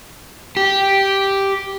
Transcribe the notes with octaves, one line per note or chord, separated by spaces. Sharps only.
G4